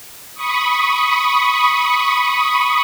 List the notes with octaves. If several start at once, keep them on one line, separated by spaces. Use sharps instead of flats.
B5 C#6 D#6